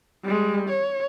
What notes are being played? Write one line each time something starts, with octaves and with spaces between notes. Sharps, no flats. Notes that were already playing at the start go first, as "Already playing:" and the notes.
G3 G#3
C#5